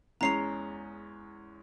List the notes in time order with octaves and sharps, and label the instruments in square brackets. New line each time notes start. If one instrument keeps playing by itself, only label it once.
[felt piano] E2 G#3 C#4 [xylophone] A#5 C7 F7